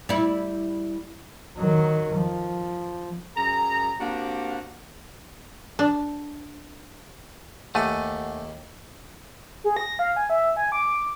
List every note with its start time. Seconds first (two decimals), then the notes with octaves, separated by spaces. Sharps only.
0.09 G3 E4
1.57 D#3 F#3
2.15 F3
3.37 F#2 G#4 A#5
4.00 A#3 C4 D4 F#4 G4
5.79 D4
7.75 D#2 A3 G4 F#5 G#5
9.64 G#4
9.77 A#6
9.99 F5
10.16 G#5
10.30 E5
10.56 G#5
10.72 D6